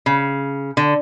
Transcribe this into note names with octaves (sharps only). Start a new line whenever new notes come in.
C#3
D3